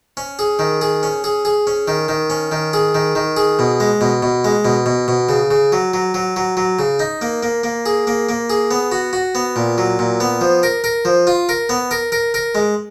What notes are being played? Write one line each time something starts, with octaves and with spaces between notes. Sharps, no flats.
C#4
G#4
D#3
G#4
C#4
G#4
G#4
C#4
D#3
D#3
C#4
D#3
G#4
D#3
D#3
G#4
B2
G#3
B2
B2
G#3
B2
B2
B2
C#3
C#3
F#3
F#3
F#3
F#3
F#3
C#3
D#4
A#3
A#3
A#3
G#4
A#3
A#3
G#4
B3
F#4
F#4
B3
A#2
F#3
A#2
B3
F3
A#4
A#4
F3
F4
A#4
B3
A#4
A#4
A#4
G#3